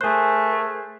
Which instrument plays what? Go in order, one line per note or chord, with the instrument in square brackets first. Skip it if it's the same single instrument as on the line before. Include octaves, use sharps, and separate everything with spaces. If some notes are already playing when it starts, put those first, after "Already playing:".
[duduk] A3 [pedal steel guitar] G#4 C5 [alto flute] A#4 [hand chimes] G#5 F#6